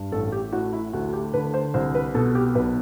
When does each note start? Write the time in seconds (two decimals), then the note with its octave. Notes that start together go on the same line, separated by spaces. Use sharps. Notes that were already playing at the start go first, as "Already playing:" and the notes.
Already playing: G2
0.12 A1 A4
0.32 G4
0.52 A2 F#4
0.73 E4
0.93 D2 F#4
1.13 G4
1.33 D3 B4
1.54 C5
1.74 C2 C5
1.95 B4
2.15 B2 A4
2.35 G4
2.55 B1 B4